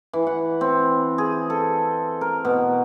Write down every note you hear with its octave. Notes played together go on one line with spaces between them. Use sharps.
E3
F#5
C4
G#4
A4
A#4
B2